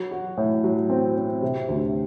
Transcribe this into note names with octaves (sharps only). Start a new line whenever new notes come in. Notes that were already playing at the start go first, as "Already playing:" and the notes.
Already playing: F#3
F#4
A2
F#3
C4
C4
C3
D2